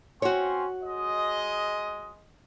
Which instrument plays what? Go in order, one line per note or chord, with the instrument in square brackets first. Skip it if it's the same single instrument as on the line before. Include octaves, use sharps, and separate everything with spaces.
[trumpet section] C4 C#4 C6 [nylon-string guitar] F#4 C#5
[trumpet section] G#3 D#5